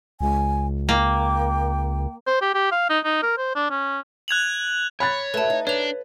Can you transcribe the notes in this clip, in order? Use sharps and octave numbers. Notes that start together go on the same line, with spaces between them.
C#2 G#5
A#3 G5
C5
G4
G4
F5
D#4
D#4
A#4
C5
D4
C#4
F#6 G#6 F7 F#7
C#5 B5 F#6 A6
F#3 A3 B4 A5
D#4
D4 B4 C#5 F7